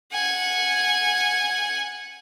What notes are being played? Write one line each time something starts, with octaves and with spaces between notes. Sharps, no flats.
F#5 G#5